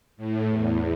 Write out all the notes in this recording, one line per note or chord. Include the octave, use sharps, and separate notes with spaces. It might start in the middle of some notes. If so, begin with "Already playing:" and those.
A2
E2